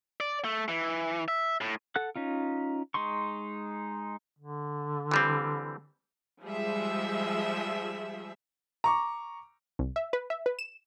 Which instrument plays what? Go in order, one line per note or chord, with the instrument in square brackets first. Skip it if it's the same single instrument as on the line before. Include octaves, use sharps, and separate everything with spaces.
[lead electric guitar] D5
A3
E3
E5
A2
[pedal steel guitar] A4 F#5 F#6
C#4 D#4 F4
G#3 D#4 C6 C#6
[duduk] D3
[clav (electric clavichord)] E3 G3 C4
[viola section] F3 G3 G#3 G#4 E5
[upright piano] A#5 C#6 D6
[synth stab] C2
E5
B4
E5
B4
E7